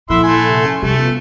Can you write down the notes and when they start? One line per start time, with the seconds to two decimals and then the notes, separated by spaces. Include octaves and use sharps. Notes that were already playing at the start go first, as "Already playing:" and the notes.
0.10 A#2 F3 E4 A4 E5 F#5 C6
0.23 A3 G#5 C6
0.49 C3
0.64 C#4
0.82 C3 G3 A3 G4
0.99 B3 F4